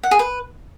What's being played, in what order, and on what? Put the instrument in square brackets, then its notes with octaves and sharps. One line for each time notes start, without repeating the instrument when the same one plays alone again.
[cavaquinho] F#5
G#4
B4